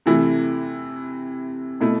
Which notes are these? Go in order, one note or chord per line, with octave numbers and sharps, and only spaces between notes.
C3 E3 A3 E4
B2 A3 E4